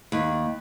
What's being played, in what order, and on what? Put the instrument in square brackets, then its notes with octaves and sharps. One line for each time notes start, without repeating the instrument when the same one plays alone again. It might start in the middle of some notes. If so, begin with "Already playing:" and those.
[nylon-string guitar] D#2